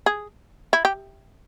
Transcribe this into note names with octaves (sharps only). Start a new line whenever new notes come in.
G#4
E4
G4